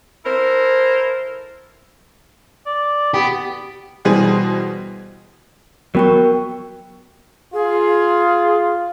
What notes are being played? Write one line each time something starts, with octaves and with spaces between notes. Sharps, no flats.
E4 A4 A#4 C5
D5
B3 G4
B2 E3 G3 G#4 C5 D#7
F#3 B3 F#4 A#4 G5 C#6
F4 G#4